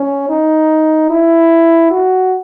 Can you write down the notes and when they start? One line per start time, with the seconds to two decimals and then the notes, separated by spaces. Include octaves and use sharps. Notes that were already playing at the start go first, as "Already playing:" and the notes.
Already playing: C#4
0.29 D#4
1.10 E4
1.91 F#4